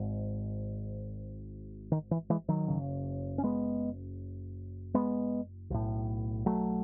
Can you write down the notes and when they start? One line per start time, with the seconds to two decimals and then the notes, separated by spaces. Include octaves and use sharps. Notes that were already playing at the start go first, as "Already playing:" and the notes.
Already playing: G#1 G#2
1.92 D#3
2.11 E3
2.30 E3 G#3
2.48 D#3 F#3
2.68 F#1 E2 C#3
3.38 C#4
3.43 G#3 B3
4.94 G#3 B3
5.70 B1 A2
6.46 F#3 A3